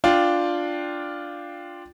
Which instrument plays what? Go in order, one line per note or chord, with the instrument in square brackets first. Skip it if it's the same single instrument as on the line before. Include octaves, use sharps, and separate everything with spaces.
[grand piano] D4 F4 G5